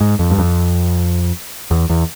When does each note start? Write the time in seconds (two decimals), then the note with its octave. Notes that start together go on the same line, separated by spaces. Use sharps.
0.01 G#2
0.19 F2
0.31 G2
0.38 F2
1.71 E2
1.89 E2